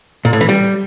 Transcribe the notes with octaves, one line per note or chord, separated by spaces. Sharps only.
A#2
A2
E3
G3